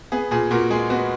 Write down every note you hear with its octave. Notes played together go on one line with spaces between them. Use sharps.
B3 G#4
A#2 G#4
A#2 F#4 A#4
G#3 G#4
B3 F#4